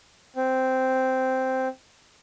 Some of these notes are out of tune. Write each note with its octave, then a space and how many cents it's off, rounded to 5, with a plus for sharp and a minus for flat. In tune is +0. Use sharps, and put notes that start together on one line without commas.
C4 -5